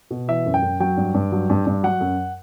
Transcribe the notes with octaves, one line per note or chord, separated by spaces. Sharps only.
B2
E3 E5
F#2
G5
F#2
F#3 G5
G2
G2
F#3
G2
G2
F#3 F#5
F#2